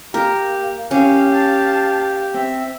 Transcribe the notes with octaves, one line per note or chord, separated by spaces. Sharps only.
A#3 G4 A#4
C#4 E4 G4 F5
F5 A5
C4 E5